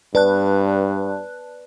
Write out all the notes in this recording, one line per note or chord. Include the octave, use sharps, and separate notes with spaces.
G2 B4 D5 A5 F#6